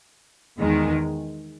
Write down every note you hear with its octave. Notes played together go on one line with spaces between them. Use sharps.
E2 D#3 G#3